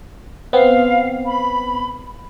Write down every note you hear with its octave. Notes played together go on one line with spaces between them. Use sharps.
B3 C4 F5
B5